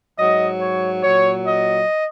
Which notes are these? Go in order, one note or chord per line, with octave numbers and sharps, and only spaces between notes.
G#2 F#3 D#5
C#5
A#2 F#3 C#5
D#5